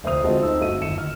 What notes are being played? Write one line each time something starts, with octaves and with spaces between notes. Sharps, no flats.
F1 D2 C5 E5 D#6 F7
G#3 C4 F4 F#4 A4 D#5
D2 C4 D#4 E6
G1 A3 F#4 D#5 D#7
G1 D#2 C#7 E7
F6